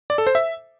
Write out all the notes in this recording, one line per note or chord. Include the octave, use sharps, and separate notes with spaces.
D5
A4
C5
E5